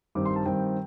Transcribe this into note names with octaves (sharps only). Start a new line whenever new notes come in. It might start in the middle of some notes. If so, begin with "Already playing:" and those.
G2 D#3 G3 C4 D6
C6
A5
G2 D#3 G3 C4 G5